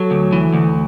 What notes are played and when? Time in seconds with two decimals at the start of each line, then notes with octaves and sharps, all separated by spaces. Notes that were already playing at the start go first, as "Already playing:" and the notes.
Already playing: F#3 A4
0.11 D2
0.33 E3
0.54 D2